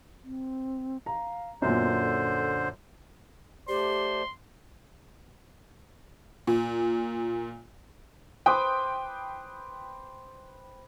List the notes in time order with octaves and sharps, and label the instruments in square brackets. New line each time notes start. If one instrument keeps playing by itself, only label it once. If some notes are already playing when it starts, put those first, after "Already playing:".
[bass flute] C4
[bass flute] F5 [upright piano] A#5
[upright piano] F#2 A#2 [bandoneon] D3 C5 [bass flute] B3
[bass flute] A4
[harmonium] A3 C5 D5 [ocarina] G4 [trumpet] C6
[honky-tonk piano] A#2
[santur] B4 C5 D6 [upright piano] G5 D#6